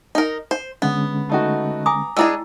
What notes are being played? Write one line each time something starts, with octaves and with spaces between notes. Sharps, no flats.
D#4 A#4
C5
D3 G#3 B3 C#4
A3 D#4 F#4
G#5 A#5 D6 D#6
G#3 D4 E4 G#4 G5 E6